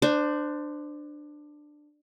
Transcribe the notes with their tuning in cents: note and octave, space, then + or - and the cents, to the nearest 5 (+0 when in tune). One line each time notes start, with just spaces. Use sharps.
D4 +15 C5 -15